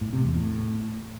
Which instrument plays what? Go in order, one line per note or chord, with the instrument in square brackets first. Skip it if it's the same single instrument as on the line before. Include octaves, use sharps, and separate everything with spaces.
[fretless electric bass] A2
C3
E2
A2